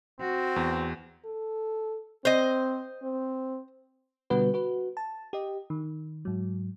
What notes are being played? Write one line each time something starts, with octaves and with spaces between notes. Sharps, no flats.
C4 F#4
E2
A4
C4 C5 D#5
C4
B2 D3 G3 B3 F#4 B4
F#4 B4
A5
G4 D#5
D#3
G#2 F#3